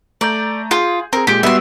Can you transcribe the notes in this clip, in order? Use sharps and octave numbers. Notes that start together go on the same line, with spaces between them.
A3 D5 A#5 G6
F4 G#4
C4 G#4 A#4
A#2 G#3 G4 D7
G3 B3 F#4 E5 C6